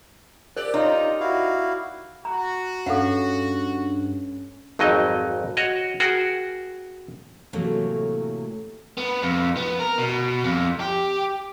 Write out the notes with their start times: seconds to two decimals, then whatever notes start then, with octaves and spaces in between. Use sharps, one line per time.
0.57 G4 A#4 C5 D5
0.74 D#4 F4 C#5 C6
1.20 E4 F#4 F5
2.25 F#4 A#5
2.86 G2 C#4 A4 F5 F#5
4.79 G#1 F2 F#3 D#4 D#5
5.57 F#4 C#5 D#5
6.00 F#4 G#4 A#4 G5
7.53 A2 C3 E3 F#3 A3 A#3
8.97 B3
9.22 F2
9.57 B3
9.80 A#4
9.98 B2
10.44 F2
10.80 G4